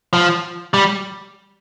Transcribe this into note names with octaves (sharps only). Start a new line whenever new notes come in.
F3
G3